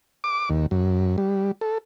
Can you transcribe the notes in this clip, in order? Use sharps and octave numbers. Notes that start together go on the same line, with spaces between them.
D6
D#2
F#2
G3
A4